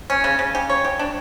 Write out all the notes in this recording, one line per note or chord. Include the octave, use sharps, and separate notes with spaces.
C#4
C#3
C#3
G4
C#5
G4
D4